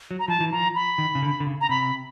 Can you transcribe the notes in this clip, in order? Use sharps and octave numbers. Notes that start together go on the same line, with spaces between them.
F#3
A#5
F3 A5
E3
F3 A#5
B5
D#3
C#3
D3
D3
C#3
A#5
C3 B5